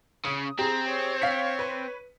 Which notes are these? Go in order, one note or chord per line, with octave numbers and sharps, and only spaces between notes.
C#3 D#6
C4 G4 G#4 A#5
C#5
F5 B6 C#7
B4